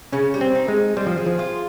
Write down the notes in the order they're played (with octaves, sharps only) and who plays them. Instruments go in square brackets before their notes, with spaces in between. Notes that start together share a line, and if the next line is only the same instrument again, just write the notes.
[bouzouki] C#3 [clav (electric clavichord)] C#4
[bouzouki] G3
[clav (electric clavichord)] C4
[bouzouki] D#4
[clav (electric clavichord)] G#3
[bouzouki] D#4
[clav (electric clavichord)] G3 [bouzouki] C4
[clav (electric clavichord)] F3
[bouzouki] G#4
[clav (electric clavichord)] F3
[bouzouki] F4